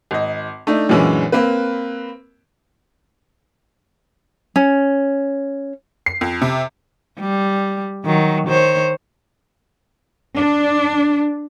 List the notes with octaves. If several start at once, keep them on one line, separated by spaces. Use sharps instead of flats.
G#1 D#5
A3 D4 D#4
F#2 A#2 D3 E3 G#3 C#4
A#3 C4 B4
C#4
C7
F2
C3
G3
D#3 F#3
D#3 C5 C#5
D4